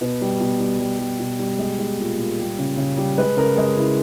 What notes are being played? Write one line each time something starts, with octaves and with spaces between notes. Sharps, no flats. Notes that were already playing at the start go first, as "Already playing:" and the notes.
B2 B4
G3
B2
G3
G3
G3
B2
G3
G#3
G#3
A#2
A#2
G3
C#3
C#3
G3
G#3 B4
C#3 A#4
G#3 G#4
C#3 E4